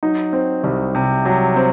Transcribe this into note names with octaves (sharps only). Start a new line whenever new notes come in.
F#3 D#4
C4
C2
C3
F#3
C4